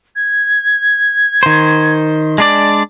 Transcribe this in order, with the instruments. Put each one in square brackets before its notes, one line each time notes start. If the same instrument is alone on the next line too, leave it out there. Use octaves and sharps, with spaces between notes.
[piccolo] G#6
[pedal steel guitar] D#3 C5
G#3 D4 D5